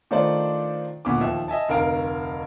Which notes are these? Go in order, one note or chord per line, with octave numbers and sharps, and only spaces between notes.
D#3 A3 D4 F4 C5 D5
D2 A#2 B3 D6
D#2 F3 E5
D#5 E5 G#5 A5
F1 D2 A#4 F5 D7